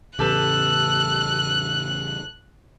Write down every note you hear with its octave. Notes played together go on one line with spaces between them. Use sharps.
E2 A2 C#3 G4 A4 B4 F#6